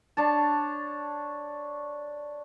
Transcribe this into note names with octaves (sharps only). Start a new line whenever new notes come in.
D4 C#5 A5